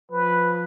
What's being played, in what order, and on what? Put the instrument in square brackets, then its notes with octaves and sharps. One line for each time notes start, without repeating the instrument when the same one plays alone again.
[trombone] F3 [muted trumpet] B4